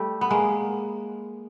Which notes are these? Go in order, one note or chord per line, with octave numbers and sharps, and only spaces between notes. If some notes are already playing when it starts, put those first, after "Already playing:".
Already playing: G3 A3
B3
G#3 A#3